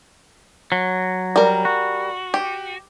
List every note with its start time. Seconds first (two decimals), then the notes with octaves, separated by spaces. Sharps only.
0.72 F#3
1.36 G3 A#4
1.65 F#4
2.34 G4